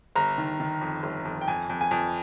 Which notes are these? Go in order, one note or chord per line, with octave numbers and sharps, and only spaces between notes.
G1 A#5
D#3
D#3
F2
G1
F2
G5
F2 G#5
F2
G#5
F2